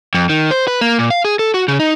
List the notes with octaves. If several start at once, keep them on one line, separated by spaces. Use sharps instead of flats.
F2
D#3
C5
B4
A#3
A#2
F5
G#4
A4
F#4
C#3
D#4